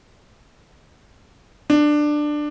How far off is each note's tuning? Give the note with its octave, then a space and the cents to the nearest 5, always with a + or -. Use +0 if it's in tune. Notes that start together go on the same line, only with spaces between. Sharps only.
D4 +15